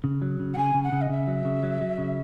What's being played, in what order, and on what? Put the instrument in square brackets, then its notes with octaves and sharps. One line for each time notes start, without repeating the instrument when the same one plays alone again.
[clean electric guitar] C#3
F#3
C#3
[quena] F#5
[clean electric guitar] C#3 [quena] G#5
[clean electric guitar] C#3
[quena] F#5
[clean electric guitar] C#3
[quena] D#5
[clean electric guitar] C#3 [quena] E5
[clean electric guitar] F#3
C#3
F#3
F#3
C#3